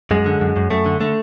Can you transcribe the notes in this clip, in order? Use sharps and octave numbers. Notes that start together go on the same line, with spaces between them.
F#2 G#3
D3
F#2
F#2
F#2 A3
D3
D3 A3